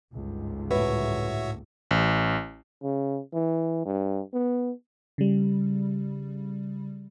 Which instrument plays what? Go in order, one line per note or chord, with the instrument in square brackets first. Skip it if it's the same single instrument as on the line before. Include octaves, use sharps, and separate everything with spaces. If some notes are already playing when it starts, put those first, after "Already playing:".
[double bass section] G1 C#2 G#2
[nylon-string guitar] A2 B4 [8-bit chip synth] F#4 C#5 E5
[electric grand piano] A1
[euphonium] C#3
E3
G2
B3
[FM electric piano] C#3 G3